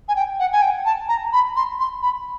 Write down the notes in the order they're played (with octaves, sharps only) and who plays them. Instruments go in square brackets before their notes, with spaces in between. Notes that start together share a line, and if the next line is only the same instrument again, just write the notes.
[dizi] G#5
G5
F#5
G#5
G5
A5
A#5
B5
C6
C6
B5